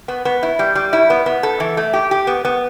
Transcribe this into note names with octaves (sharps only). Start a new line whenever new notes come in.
B3
B3
E4
G3
G3
E4
B3
B3
A4
E3
A3
G4
G4
B3
B3